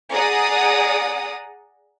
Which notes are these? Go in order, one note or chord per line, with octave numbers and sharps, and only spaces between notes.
G#4 D5 F#5 A#5 D#6